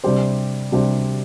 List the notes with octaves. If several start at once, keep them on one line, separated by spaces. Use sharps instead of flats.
C3 G3 D4 G4 C5
C3 G3 D4 G4 C5